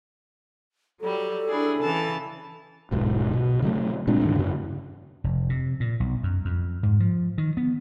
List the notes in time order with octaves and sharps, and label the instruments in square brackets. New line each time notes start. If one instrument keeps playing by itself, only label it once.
[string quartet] F#3 G3 [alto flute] A4
[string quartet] D4 E4 G#4
C#3 E3 A5
[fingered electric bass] D1 B1 G#2
B2
C#3 F#3 A3
A#2 G#3 C4 D4
D2 G#2 D#3
F#2 C#3
[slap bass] F1
C3
A#2
B1
F#2
F2
G#2
F3
D#3
B3